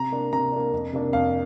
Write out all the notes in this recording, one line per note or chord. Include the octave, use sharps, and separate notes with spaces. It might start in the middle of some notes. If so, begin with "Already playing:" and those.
Already playing: C3 A#5
A#3 D4
C3 A#5
A#3 D4
F2
C3 A#3 D4
F2 F5